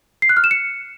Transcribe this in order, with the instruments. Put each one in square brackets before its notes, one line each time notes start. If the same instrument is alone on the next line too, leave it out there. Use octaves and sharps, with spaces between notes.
[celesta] C7
F#6
F6
E7
C#7